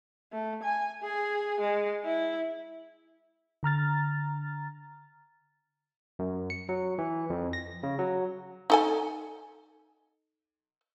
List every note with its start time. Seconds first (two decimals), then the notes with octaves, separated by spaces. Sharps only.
0.32 A3
0.63 G#5
1.02 G#4
1.61 G#3
2.05 E4
3.63 D3 A#5 F6 A6
6.19 F#2
6.50 C#7
6.69 F#3
6.98 E3
7.30 F2
7.53 A#6
7.83 C#3
7.99 F#3
8.70 D#4 A4 G#5